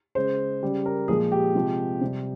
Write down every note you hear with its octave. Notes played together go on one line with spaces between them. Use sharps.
C#3 G#3 C5
C#3 G3
A#4
A#2 F3 G#3 G#4
G4
C3 F3 G#3
C3 G3